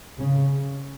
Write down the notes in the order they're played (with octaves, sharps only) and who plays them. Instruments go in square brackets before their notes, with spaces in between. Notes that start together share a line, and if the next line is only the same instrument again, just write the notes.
[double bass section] C#3